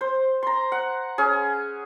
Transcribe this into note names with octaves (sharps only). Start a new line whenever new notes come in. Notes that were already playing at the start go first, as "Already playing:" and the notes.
C5
A#5 C6
F#5
C#4 G#4